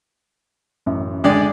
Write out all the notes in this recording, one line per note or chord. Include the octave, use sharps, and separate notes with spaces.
A1 F#2
D3 G#3 D5 G5